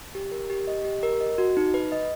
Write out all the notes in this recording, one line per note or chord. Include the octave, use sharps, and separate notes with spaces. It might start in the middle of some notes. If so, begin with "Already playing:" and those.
G4
A#4
G4
D#5
G4
A#4
D#5
F#4
D#4
B4
D#5